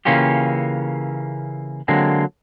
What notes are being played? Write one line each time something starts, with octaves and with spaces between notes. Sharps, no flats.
C#3 E3 A#3 C#4 F4 G4
D3 F#3 G#3 A#3 C4